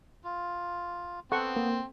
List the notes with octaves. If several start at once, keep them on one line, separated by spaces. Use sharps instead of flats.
F4
B3 C4 A4 F#5 C#6
A#3